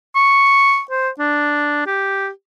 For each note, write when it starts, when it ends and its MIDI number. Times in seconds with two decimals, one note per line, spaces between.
0.15 0.81 85
0.90 1.09 72
1.19 1.82 62
1.86 2.29 67